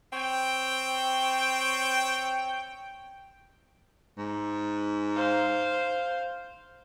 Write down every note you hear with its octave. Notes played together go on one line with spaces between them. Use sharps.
C4 C#5 G5
G#2
C5 F5